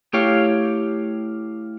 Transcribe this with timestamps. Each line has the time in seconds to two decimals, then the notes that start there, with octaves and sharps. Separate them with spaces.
0.13 A3 E4 G4 C#5 F5